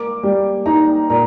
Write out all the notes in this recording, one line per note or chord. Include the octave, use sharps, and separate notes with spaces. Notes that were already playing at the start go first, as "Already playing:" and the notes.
Already playing: A#3 D6
G3
D#4 A#5
A#2 A#5